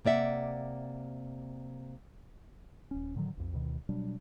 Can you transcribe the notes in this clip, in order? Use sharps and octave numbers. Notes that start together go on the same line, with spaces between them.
C3 A#3 D5 E5 F#5
D#1 C#4
A2 D3 D#3 F#3
B1 F2
D2 B2 D#3
B2 F#3 G3 D4